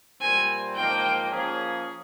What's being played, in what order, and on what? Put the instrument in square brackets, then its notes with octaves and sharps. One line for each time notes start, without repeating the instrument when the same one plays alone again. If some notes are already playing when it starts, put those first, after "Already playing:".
[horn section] A#2 G3 C4 [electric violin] G#5
[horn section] G#2 F3 A#3 [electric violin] G5
[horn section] F3 A#3 C#4 G#4